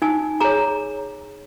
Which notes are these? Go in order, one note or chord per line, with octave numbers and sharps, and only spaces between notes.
D#4 G#5
G#4 C#5 A#5